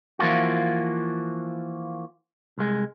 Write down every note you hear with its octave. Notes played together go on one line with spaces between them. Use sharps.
E3 F3 A#3 F4 F#4
C2 G#3